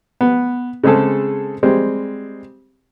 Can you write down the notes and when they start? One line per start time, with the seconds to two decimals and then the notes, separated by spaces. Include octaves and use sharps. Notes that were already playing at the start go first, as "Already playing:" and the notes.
0.21 B3
0.84 C#3 G#3 C4 G#4 A4
1.63 G3 G#3 C4